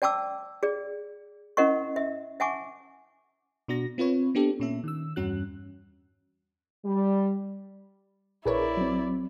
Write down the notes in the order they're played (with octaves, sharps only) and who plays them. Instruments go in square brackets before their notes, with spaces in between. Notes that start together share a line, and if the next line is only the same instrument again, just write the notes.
[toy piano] D5 G5 A5 D6 E6
G#4 D5
C#4 E4 A#4 D#5 F#5 C#6
E5
E5 F#5 G#5 A5 C#6 D6
[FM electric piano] B2 D4 F#4 A#6
C4 F4 B4 C#5
B3 D4 G4 A4
A#2 C#4 E5
D#3 E6
E2 G2 C#4 F#4 F#6
[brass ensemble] G3
[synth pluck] A#1 B4 C#5 [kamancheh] E4 D5 [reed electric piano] G#4 A#4
[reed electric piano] F#3 C4